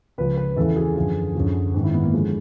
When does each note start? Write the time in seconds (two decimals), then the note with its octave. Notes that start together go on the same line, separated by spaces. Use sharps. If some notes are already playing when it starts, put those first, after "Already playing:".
0.18 C#2 C#3 F3 B4
0.37 B4
0.56 E2 C#3 E3 A4
0.76 G#4
0.96 F#2 D3 F3
1.35 F#2 D3 F3
1.74 G#2 D#3
1.84 E4
1.94 B3
2.03 A#3
2.13 D3 F3 G#3